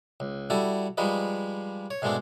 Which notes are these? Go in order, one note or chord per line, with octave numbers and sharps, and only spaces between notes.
C#2
G3 E4 F#4 A4
F3 G3 G#3 D#4 B4
C#5
G#2 B2 G#3 A3 C4 D4